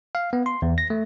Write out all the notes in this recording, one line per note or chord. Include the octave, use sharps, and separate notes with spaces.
F5
B3
C6
E2
A#6
A3